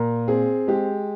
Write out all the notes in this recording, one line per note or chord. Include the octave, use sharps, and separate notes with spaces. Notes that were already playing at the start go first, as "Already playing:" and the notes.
Already playing: A#2 A#4
C4 G#4
G#3 G4